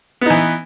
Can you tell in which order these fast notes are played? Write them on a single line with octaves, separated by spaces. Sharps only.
B3 D#4 E3